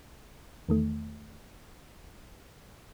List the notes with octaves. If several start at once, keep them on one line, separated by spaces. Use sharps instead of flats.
E2 D#3 A3